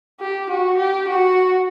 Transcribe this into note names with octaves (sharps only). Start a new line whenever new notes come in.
G4
F#4
G4
F#4